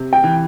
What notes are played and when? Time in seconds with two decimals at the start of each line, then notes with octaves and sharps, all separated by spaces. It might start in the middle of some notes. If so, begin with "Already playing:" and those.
Already playing: C3
0.13 G5
0.24 E3